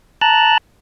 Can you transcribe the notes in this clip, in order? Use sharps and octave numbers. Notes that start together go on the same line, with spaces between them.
A5 A#5 F#6